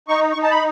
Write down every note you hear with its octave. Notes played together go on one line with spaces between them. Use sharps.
D#4 C#6
C#6
D#4
A5
B5